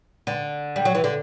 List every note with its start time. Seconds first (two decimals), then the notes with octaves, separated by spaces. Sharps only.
0.27 D3
0.76 G3
0.85 F#3
0.95 E3
1.04 D3